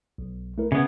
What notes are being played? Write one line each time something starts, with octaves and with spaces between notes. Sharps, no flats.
B1
A3 E4 A#4
C#3 B3 E5 G#6